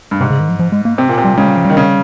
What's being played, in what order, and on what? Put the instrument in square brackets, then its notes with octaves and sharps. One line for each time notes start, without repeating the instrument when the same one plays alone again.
[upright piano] G2
[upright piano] G#2 [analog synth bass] C3
[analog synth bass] C#3
D#3
F3
F3
G#3
A#3
[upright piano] C3 [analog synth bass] C4
[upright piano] A#2
C3
[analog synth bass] G3
[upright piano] C#3 [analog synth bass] G#3
[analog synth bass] G3
F3
[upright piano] D#3 [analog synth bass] G3
[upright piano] C#3